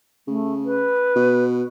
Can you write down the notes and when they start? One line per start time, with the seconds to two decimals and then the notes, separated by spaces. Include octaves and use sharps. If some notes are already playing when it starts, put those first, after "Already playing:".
0.28 C#3 A3
0.65 B4
1.16 B2